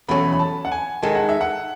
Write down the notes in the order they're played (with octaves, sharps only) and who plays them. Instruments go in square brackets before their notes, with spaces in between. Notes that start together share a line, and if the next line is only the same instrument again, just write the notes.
[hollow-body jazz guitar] E2 B2 F#3 A3 C#4 [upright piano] B5
[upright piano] B5
A5
F#5
G#5
[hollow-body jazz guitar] D#3 G#3 D#4 A4 [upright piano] G#5
[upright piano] F#5
E5
F#5